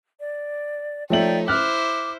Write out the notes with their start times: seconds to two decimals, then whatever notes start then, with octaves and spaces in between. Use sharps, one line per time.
0.20 D5
1.10 F3 A3 D#4 C#5 D5 E5 G5 F#7
1.48 E4 C5 D6 F6 F#6